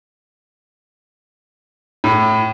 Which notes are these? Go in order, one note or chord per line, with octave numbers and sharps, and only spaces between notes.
A2